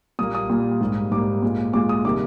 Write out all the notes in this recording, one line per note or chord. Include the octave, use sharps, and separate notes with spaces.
A#2 G3 A#3 D#6
D#6
A#2 G3 A#3
G#2 G3 A#3
G#2 G3 A#3 D6
A#2 G#3
A#2 G#3 D6
D#6
C3 D#3 G3 A#3 D6